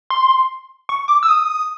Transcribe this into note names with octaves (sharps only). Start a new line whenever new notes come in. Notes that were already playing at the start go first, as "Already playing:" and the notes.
C6
C#6
D6
E6
D#6